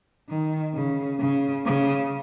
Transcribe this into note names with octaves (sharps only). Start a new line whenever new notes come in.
D#3
C#3
C#3
C#3